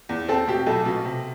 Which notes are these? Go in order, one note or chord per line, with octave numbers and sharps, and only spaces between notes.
E2
C4 A4
B2 G4
B1 A4
B2
C3